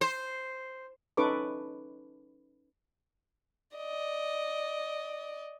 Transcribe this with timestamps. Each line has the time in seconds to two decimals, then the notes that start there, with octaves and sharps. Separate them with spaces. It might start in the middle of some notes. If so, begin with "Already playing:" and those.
0.01 C5
1.17 C#4 D#4 A4 B4 C#6 D6
3.77 D5 D#5